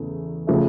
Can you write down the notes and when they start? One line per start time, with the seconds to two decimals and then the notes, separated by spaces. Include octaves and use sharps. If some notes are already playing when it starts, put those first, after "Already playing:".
Already playing: E2 C#3 A3
0.47 C#3 F3 A3